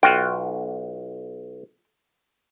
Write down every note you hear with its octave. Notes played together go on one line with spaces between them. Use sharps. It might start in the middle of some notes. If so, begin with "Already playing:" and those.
B1 F4 F#4 G5